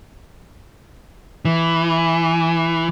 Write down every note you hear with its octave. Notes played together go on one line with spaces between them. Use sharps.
E3